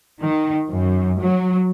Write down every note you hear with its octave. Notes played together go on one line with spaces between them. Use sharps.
D#3
F#2
F#3